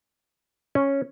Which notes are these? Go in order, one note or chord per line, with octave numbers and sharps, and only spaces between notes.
C#4